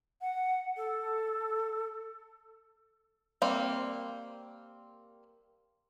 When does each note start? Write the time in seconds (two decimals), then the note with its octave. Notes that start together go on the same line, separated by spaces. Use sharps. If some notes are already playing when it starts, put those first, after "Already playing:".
0.21 F#5
0.77 A4
3.42 G3 A#3 C4